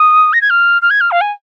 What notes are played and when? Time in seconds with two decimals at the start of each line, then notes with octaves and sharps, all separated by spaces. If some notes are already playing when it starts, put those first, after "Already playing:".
Already playing: D#6
0.33 A#6
0.41 G#6
0.50 F6
0.82 F6
0.90 G#6
1.01 F6
1.11 F5
1.21 G#5